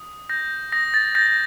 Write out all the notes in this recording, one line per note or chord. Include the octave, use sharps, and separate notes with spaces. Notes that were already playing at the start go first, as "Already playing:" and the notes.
Already playing: D#6
G6 A#6
D#6 A#6
A6
G6 A#6
A#6